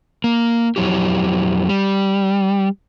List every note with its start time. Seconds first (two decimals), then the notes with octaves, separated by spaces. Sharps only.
0.24 A#3
0.76 F2 C3 F#3 E4 G4
1.69 G3